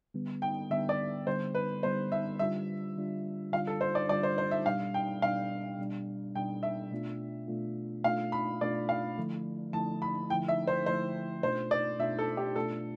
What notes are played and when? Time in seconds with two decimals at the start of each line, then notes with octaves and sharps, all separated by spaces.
0.14 D3 G3 B3
0.42 G5
0.70 D3 G3 B3 E5
0.89 D5
1.27 D3 G3 B3 C5
1.55 B4
1.83 D3 G3 B3 C5
2.12 E5
2.39 D3 G3 D4 F4 E5
2.97 D3 G3 D4 F4
3.52 D3 G3 D4 F4 F5
3.67 A4
3.81 C5
3.95 D5
4.09 D3 G3 D4 F4 D5
4.23 C5
4.38 C5
4.51 E5
4.65 B2 G3 D4 F5
4.94 G5
5.22 B2 G3 D4 F5
5.79 B2 G3 D4
6.35 B2 G3 D4 G5
6.63 E5
6.91 B2 A3 D4 F4
7.48 B2 A3 D4 F4
8.04 B2 A3 D4 F4 F5
8.32 B5
8.61 B2 A3 D4 F4 D5
8.89 F5
9.17 D3 F3 A3 E4
9.73 D3 F3 A3 E4 A5
10.02 B5
10.30 D3 F3 A3 E4 G5
10.48 E5
10.67 C5
10.86 D3 F3 A3 E4 C5
11.43 B2 A3 D4 F4 C5
11.71 D5
11.99 B2 A3 D4 F4 E5
12.19 A4
12.37 G4
12.56 B2 A3 D4 F4 A4